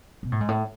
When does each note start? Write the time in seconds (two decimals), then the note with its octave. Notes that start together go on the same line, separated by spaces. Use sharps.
0.23 B2
0.32 A2
0.40 G#2
0.48 A2